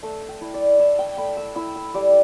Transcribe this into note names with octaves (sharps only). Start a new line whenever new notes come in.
A3 E5
G5
E4
D5
E4 E5
G5
A3 B5
E6
E4 E6
E6
G3 D6